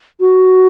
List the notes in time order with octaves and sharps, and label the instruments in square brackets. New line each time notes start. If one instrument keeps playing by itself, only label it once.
[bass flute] F#4